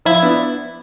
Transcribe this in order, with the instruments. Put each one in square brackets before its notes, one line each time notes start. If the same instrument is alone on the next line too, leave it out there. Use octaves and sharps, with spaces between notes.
[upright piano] F3 [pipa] E4
[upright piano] B3 D4